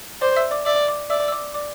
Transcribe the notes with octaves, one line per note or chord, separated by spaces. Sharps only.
C5 D5 D6
E5 E6
D5 D6
D5 E5 E6
D5 D6
D5 E5 E6
E6
D5 D6
D5 D6